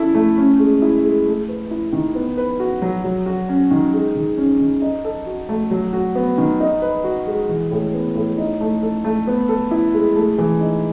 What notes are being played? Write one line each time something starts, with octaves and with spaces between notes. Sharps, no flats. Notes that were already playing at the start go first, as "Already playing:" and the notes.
Already playing: C#4 E4 A4
A3
C#4
G#3
E4
G#3
A3
B4
E4
D#3
B3
B4
F#4
F#3
F#3
F#4
C#4
D#3
G#3
D#3
C#4
D#3
D#4
A4
F#4
A3
F#3
F#4
B3
D#3
D#4
B4
F#4
G#3
E3
A2
B3
A2
D#4
A3
A4
A3
B3
A4
E4
G#3
A3
E3
D#4